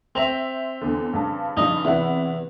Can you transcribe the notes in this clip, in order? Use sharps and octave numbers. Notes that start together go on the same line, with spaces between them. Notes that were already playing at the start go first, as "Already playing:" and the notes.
C4 C5 E5 A#5
E2 D3
G2 C#3 A5
G2 C#3 F3 D#4 D#5
E2 C3 E4 F#5